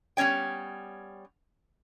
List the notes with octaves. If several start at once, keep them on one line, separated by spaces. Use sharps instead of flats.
G3 B3 C#4 C#5 G5